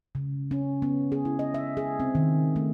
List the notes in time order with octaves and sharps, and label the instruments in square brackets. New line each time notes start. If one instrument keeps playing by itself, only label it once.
[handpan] C#3
C#4
B3
G#4
E4
D#5
E5
G#4
C4
D#3
A3